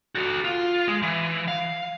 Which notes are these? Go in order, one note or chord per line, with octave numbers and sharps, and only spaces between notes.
F#4 A4
F4
G#3
E3
F5